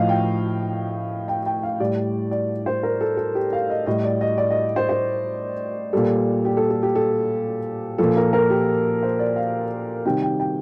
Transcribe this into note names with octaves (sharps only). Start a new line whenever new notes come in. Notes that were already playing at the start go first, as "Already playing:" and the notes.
Already playing: A2 F3 D#5 F5
G5
G5
G5
F5
A2 G3 D5
D5
C5
A#4
A4
A4
G4
F5
D#5
A2 G3 D#5
D5
D#5
D5
D#5
C5
C5
A#2 G3 A4
G4
A4
A4
G4
A4
A#2 F3 A4
A#4
A#4
G4
C5
D5
F5
C3 D#3 G3 G5
G5
G5